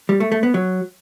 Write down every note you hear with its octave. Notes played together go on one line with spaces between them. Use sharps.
G3
A3
A3
B3
F#3